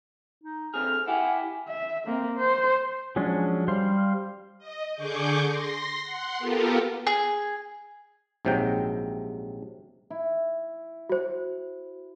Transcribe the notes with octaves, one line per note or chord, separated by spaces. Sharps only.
D#4
D3 C4 G#4 F6
E4 G4 F#5 G#5
E5
A#3 C4
C5
F3 F#3 G#3 C#4 D4
G3 C5 F5 C6
D#5
D3 G#4 C#6 D6 G6
C6 A#6
F#5 C6
B3 F4 G4 A4 A#4
G#4
A#1 G#2 C3 F#3 G5
E4
F#4 C5